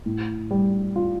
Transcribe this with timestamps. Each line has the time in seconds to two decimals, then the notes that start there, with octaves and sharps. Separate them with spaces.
0.06 A2
0.51 G3
0.96 F4